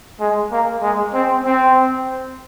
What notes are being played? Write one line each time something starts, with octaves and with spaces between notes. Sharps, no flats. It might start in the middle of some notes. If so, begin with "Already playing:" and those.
G#3
A#3
G#3
C4
C4